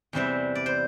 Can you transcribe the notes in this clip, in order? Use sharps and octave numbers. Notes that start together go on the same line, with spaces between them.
E2 C3 E3 G3 C4 E5
D5
C5